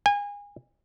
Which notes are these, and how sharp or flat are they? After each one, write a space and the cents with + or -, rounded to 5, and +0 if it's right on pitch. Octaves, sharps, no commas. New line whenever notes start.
G#5 -30